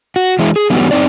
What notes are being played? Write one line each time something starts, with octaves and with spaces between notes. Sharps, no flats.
F#4
E3 G#3 E4
G#4
E3 F#3 G3 A3 B3 D#4
F#2 C4 D#4 D5